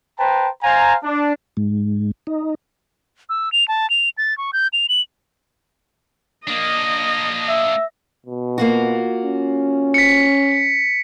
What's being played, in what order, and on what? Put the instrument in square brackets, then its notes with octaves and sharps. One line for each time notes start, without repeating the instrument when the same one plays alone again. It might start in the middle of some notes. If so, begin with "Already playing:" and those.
[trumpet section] B4 C5 G5 A5 A#5
C5 F5 G#5 A#5
D4
[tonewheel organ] G#2
D#4
[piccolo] E6
F7
A5
F7
A6
C#6
G6
F7
F#7
[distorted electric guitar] A#3 D4 [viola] D#5
[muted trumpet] E5
[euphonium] B2
[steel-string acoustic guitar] A#3 F4 F#4
[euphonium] C#4
[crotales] B6 C#7